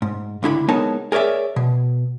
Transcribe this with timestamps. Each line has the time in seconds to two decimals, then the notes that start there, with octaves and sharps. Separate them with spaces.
0.02 G#2
0.43 C#2 D3 E4 B5
0.69 G#3 B3 D#4 A#4 C#5 A5
1.12 G#4 A#4 C#5 D5 E5
1.56 B2